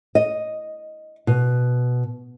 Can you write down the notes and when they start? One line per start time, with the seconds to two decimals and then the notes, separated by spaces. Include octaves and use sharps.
0.15 D#5
1.27 B2